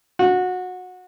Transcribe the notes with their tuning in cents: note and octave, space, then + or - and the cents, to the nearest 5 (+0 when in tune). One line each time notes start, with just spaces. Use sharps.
F#4 -20